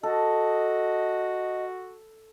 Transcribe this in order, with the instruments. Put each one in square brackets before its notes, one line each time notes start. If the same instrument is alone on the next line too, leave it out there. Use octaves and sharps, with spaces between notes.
[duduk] F#4 [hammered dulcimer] A4 [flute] D#5